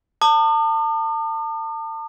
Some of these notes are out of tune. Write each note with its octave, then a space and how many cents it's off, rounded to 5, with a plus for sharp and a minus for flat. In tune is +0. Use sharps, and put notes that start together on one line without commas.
A5 +35 D#6 -45